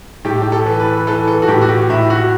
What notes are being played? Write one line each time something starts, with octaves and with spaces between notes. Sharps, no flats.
A2 G4
G4
A4
E3
B4
E3 A4
A4
F#4
A2 G4
F#4
G4
A2 E4
F#4